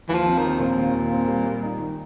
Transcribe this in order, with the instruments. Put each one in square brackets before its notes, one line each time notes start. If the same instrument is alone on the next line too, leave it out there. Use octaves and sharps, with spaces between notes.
[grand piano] D#2 [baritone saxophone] E3
[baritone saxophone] F3
[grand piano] C4
[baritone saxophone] D#3
[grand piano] D#2
[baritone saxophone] A#2 [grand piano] C4
[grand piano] D#2
D#2
C4
G3
G3
D#4
D#3